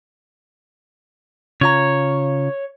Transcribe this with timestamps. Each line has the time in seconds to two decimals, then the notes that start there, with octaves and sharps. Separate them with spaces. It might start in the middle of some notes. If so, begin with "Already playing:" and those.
1.61 C#3 F4 C#5 A#5